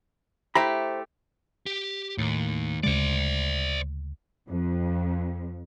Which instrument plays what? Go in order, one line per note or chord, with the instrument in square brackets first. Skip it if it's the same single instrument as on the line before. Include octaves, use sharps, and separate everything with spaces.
[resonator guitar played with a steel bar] A3 E4 G4 [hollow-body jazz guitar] C5 A#5 B5
[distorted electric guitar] G4
[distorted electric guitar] D#2 [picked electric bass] A2
[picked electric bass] D2 C#3 G#3 [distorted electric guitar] C5 D5
[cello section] F2